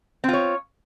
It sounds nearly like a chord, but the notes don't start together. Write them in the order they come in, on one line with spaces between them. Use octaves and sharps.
C4 F4 C#5